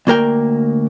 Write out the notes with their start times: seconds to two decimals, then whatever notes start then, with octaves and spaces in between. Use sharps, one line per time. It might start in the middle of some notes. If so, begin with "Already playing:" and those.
0.07 D2 A#3 A#4 G5